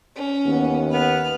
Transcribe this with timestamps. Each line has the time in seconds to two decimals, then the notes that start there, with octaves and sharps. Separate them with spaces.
0.16 C#4
0.46 D#2 B3
0.90 B3 B4 F6